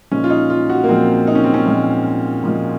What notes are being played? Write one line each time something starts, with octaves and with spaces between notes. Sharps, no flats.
A#2 F3 G#3 C#4
F4
D#4
F4
F#4
A#3
A#2 F3 G#3 C4
D#4
C#4
C4
C#4
A#2 F3 G#3
A#2 F3 G#3